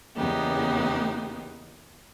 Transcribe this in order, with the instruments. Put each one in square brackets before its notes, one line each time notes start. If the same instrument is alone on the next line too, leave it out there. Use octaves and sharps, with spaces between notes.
[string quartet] E2 C#3 A#3 B3 D#4 G4